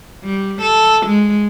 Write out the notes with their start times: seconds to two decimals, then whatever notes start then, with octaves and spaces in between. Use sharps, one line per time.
0.23 G3
0.61 A4
1.06 G#3